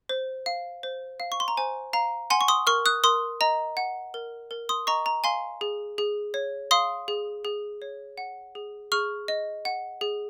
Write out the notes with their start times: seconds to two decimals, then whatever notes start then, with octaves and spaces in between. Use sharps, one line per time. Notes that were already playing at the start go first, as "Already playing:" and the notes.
0.09 C5
0.46 F5
0.83 C5
1.20 F5
1.32 C#6
1.40 C6
1.48 A#5
1.57 C5 G#5
1.93 F5 A#5
2.30 F#5 G#5 C6
2.41 C#6
2.48 C6 D#6
2.67 A#4 C#6 F6
2.86 D#6 F#6
3.04 A#4 C6 D#6
3.41 D#5 A#5
3.77 F#5
4.14 A#4
4.51 A#4
4.69 C6 D#6
4.87 D#5 A#5 C#6
5.06 A#5
5.24 F5 G#5 C6
5.61 G#4
5.98 G#4
6.34 C#5
6.71 F5 C6 D#6
7.08 G#4
7.45 G#4
7.82 C#5
8.18 F#5
8.55 G#4
8.92 G#4 C#6 F6
9.28 D#5
9.65 F#5
10.01 G#4